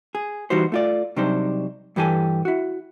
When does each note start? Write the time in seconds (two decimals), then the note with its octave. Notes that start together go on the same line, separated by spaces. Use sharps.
0.15 G#4
0.50 E3 G3 D#4 F#4 C5
0.72 A3 F4 D5
1.16 C3 F#3 G3 D4 D#4 C5
1.96 G2 E3 G4 A4 G#5
2.45 E4 F#4